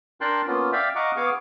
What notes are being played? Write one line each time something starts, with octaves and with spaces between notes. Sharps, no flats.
D4 A#4 G5 A5 C6 F#6
A#3 B3 C#4 F4
D5 E5 F5 G5
D#5 F5 F#5 A#5 C#6 D6
B3 G#4 F5 G#5 C#6 D6